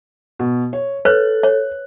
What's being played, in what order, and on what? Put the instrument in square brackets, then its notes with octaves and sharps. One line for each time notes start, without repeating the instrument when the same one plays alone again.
[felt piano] B2
C#5
[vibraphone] A4 [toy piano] B4 C#5 [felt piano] F#6
[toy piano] C#5